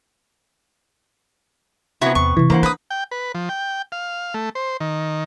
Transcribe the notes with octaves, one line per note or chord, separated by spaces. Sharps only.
C3 B3 E4 F#4 C#5
E2 C#6
F2 C3 E3
A#3 D4 C5 F#5
D4 B4 D#6
G5
B4
F3
G5
F5
A3
C5
D#3